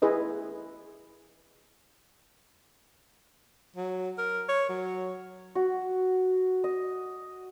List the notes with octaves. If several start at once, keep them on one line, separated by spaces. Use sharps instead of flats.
E4 G#4 B4 D#5
F#3
A#4
C#5
F#3
F#4
D#5